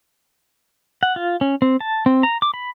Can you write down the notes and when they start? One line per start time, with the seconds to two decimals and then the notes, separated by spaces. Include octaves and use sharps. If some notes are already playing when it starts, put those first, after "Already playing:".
1.03 F#5
1.16 F4
1.41 C#4
1.62 C4
1.81 A5
2.06 C4
2.23 A#5
2.42 D6
2.54 B5